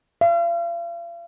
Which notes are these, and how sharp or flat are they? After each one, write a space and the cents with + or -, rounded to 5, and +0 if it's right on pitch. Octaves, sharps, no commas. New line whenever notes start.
F5 -40